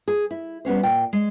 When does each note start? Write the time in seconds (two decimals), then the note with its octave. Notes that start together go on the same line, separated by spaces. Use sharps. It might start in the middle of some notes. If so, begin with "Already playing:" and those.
0.08 G#4
0.31 E4
0.65 G3 B3 C#4 C5
0.83 A#2 G5
1.13 G#3